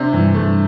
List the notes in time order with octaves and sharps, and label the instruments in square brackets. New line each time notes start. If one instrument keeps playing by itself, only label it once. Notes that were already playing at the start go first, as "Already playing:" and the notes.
Already playing: [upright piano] C3 [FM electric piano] D4
[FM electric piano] G2 [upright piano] E3
[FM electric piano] G2 [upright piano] A3